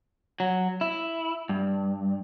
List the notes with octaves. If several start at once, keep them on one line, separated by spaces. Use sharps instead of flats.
F#3
E4
G2